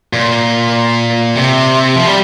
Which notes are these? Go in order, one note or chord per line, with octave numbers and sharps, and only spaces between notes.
A#2
C3
F3
G3